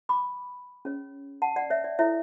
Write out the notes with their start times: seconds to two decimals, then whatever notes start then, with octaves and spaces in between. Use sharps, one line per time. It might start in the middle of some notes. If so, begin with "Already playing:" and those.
0.09 B5 D6
0.85 C#4 G#4 C#5
1.42 F#5 A5
1.56 D5 F#5
1.70 C#5 E5
1.84 D5
1.99 E4 A4 C#5 E5